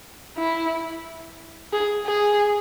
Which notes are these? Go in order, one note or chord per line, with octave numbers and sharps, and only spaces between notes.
E4
G#4
G#4